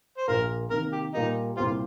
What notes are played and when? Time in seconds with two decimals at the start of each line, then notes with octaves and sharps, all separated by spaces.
0.18 C5
0.28 A#1 A#2 A#3 A#4
0.71 C3 D#3 A#3 A#4
0.92 G4
1.14 A#2 G3 A#3 D#4 G4
1.57 C2 A#2 A#3 F4 G4 C5